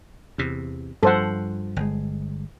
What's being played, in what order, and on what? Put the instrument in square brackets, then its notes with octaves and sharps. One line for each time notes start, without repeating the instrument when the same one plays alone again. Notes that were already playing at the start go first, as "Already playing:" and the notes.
[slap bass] E2 C3
[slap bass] G2 F3 [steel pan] A4 C5 F#5
[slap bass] G1 G#3